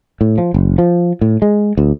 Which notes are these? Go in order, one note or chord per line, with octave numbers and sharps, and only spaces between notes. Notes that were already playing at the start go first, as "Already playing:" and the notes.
A2
F3
F#1
F3
A2
G#3
D2